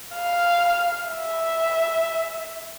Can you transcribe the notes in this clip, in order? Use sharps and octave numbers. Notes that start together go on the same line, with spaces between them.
F5
E5